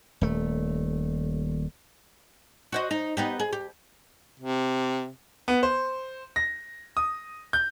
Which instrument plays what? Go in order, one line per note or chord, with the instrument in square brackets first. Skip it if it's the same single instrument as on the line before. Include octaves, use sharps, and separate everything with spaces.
[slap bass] D#1 A3
[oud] F#4 C5 D#5
D#4
B3 D#4 G4
G#4
G4
[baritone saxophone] C3
[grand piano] B3
C5
A#6
D#6
G6